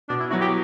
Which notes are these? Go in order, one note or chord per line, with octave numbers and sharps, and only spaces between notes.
B2 D4
E4
F#3 B3 E4 F#4
G4